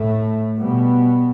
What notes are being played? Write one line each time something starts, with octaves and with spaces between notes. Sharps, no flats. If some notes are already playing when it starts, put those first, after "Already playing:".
Already playing: A2 A3
B2 G3 B3